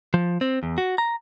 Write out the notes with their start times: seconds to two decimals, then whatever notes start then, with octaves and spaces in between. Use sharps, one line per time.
0.14 F3
0.41 C4
0.63 E2
0.78 F#4
0.98 A#5